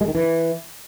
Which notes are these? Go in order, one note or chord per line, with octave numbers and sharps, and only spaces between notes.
G#3
D#3
E3